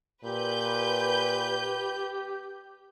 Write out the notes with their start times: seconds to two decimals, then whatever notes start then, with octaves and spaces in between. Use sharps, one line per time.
0.24 A#2 G4 B4 G6